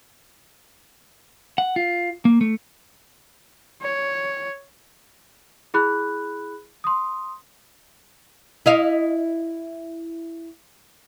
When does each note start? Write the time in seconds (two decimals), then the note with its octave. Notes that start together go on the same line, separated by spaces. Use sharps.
1.58 F#5
1.76 F4
2.25 A#3
2.41 A3
3.82 C#5
5.74 E4 G#4 B5 F#6
6.84 C6 D#6
8.66 E4 D#5 F5